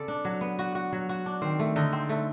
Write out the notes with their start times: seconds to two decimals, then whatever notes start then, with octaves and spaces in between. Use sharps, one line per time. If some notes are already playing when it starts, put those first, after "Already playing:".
Already playing: C#3 C4 A4 D5
0.08 D4
0.25 F#3
0.41 B3
0.59 F#4
0.75 F#4
0.93 F#3
1.09 F#4
1.26 D4
1.42 D#3 C4
1.59 A3
1.76 D3 D#4
1.93 C4
2.09 D3 A3